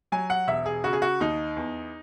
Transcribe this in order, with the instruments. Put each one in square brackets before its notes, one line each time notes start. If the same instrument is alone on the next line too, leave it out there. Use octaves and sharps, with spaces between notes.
[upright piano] F#3 G#5
F#5
E1 E5
G#4
C#3 F#4
G#4
F#4
D#2 D#4
E2